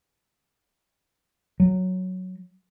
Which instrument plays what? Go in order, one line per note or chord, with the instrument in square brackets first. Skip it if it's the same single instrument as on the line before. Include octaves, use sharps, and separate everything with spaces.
[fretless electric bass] F#3